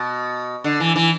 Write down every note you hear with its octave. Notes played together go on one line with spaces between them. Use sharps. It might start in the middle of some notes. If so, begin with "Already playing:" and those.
Already playing: B2
D3
E3
E3